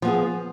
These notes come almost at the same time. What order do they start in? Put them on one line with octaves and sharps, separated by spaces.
F3 B3 G#4